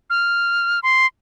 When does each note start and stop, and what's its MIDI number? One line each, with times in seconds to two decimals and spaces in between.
0.10 0.80 89
0.83 1.06 84